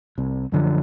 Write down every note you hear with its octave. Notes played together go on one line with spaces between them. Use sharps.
C2 C3
F#2 D3 F3